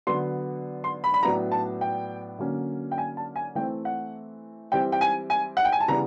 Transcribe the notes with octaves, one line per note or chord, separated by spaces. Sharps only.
D3 F#3 B3 D4 C6
C6
B5
B5
A2 F#3 B3 D4 A#5
A5
G5
D3 F#3 A#3 C#4
G5
G#5
A5
G#5
E3 A3 C4 G5
F#5
E3 G3 C4 G5
G5
G#5
G#5
F#5
G5
G#5
A5
C#3 E3 G3 B3 D4 A#5